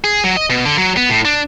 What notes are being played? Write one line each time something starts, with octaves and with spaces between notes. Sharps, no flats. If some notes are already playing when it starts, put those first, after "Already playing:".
G#4
F#3
D#5
B2
D3
F#3
B3
A2
D4